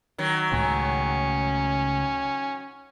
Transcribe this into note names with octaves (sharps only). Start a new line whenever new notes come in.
D#3 F#3
C#2 A2 C#3 C#4